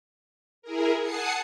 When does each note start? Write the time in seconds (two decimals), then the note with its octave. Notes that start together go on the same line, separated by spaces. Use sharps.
0.62 E4 G#4 A#4
1.00 F#5 G#5 A5 D#6 C7 C#7